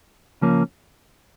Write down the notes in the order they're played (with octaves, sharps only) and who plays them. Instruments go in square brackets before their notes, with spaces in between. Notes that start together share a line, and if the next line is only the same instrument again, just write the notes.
[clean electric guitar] C#3 F3 A#3 C#4